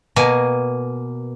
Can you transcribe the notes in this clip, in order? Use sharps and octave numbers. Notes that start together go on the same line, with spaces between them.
B2 A#3 G#5